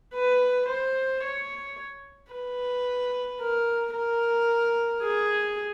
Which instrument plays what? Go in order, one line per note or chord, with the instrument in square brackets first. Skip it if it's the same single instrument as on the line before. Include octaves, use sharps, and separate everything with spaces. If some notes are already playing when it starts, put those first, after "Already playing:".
[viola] B4
C5
C#5
B4
A#4
A#4
G#4